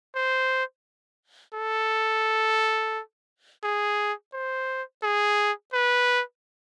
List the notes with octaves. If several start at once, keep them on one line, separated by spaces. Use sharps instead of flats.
C5
A4
G#4
C5
G#4
B4